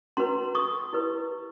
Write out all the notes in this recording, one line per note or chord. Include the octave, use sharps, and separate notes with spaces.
C#4 F#4 B4 A#5 C6
C#6 D#6
E4 G4 B4